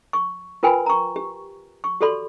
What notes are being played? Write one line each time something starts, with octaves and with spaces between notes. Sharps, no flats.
C#6
F4 A#4 B4 G5 G#5 B5
A#5 C#6
G4
C#6
F#4 G4 A4 D5 B5 C6